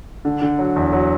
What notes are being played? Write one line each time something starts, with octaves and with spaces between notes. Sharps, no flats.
D3
D3
F#3
E2
F#3